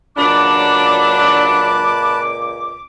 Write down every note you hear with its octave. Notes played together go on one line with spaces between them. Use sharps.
C#2 A#2 F#3 D4 A5 B5 D6 F#6